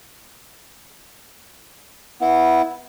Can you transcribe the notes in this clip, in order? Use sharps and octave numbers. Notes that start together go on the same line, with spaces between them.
B3 E4